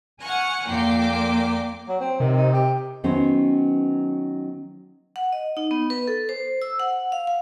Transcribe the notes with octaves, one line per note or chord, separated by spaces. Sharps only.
F#5 G#5 C#6 F6 F#6
F2 A#2 A#3 G5 D6 C7
F#3
C4
C3 D#3
D#4
G4
D#3 F#3 B3 C#4 C5
F#5
D#5
D#4
B3
B4
A4
C5
E6
F#5
F5
F5